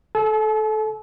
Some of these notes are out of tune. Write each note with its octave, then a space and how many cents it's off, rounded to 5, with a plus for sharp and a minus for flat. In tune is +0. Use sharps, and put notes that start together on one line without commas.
A4 -20 A5 -45